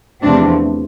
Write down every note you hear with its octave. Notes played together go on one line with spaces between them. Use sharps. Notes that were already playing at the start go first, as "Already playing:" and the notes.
E2 C3 F3 A3 C4 D4